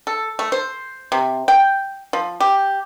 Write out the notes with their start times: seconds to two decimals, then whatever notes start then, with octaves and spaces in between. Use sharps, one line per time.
0.07 A4
0.39 A3
0.52 C5
1.12 C3
1.48 G5
2.13 F3
2.40 G4